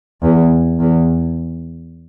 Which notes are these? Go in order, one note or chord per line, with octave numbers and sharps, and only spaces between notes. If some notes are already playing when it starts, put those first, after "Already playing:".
E2
E2